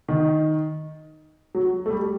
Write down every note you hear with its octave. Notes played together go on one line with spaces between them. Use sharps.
D#3
F#3
A3
G3